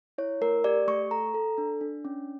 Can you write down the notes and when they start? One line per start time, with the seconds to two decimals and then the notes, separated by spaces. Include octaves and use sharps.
0.18 E4 C#5
0.41 A3 A#4
0.64 G4 D5
0.88 A3 C#6
1.11 A4 A#5
1.34 A4
1.58 D4
1.81 D4
2.05 C#4